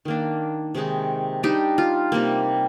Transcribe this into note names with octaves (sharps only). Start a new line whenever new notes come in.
D#3 A#3 D4
C3 D#3 G#3 D#4
G3 D4 D#4 G4
F4
C3 G3 A#3